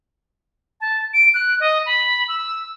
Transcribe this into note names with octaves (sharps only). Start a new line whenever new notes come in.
A5
D7
F#6
D#5
B5
E6